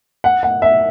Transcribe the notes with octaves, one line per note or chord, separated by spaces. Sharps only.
F#5
F#5
E5